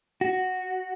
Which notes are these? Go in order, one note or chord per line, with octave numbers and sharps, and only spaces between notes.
F#4